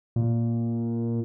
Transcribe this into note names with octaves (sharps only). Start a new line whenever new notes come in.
A#2